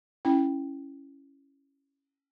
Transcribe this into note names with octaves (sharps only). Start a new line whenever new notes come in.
C#4 E4 G5